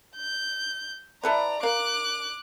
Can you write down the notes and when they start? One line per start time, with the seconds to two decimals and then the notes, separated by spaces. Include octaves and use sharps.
0.16 G6
1.23 E4 A4 B4 D5 A#5
1.63 A#4 F5 D6 F#6